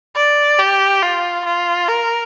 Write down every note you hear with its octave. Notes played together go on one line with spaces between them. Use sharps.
D5
G4
F4
F4
A#4